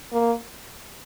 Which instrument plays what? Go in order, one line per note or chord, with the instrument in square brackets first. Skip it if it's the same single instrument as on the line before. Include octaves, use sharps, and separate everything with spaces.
[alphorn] A#3